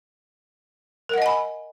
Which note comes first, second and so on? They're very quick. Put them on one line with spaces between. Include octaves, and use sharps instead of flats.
A#4 F#5 D#5 G#5 B5